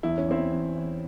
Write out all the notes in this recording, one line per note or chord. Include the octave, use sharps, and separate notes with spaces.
E2 E4
C#4
E2 C4 E4
E2
E3